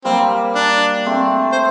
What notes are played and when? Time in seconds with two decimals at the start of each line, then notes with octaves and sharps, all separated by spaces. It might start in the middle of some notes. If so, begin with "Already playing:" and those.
0.05 G3 A#3 C4
0.55 D4
1.06 A3 C4
1.52 C5